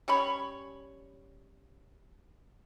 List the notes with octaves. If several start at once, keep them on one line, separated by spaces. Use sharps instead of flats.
G3 C#4 C#5 B5